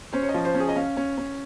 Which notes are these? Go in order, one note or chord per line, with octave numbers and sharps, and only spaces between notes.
C#4 C5
C#5
D#5
F3
C5
C#4
G#4
D#5
C#4 F5
C#4
C#4